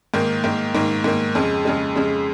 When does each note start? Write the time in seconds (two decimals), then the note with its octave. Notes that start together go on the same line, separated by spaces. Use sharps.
0.14 G#2 D#3 A#3
0.44 G#2 D#3 A#3
0.75 G#2 D#3 A#3
1.04 G#2 D#3 A#3
1.35 F2 C#3 G#3
1.65 F2 C#3 G#3
1.95 F2 C#3 G#3